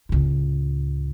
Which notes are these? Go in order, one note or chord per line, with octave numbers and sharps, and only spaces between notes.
C#2 A2